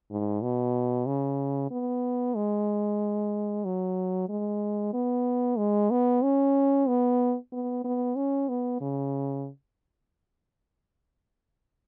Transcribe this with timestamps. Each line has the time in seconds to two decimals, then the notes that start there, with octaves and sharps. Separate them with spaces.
0.11 G#2
0.43 B2
1.07 C#3
1.71 B3
2.36 G#3
3.65 F#3
4.29 G#3
4.93 B3
5.58 G#3
5.91 B3
6.23 C#4
6.88 B3
7.53 B3
7.84 B3
8.16 C#4
8.49 B3
8.81 C#3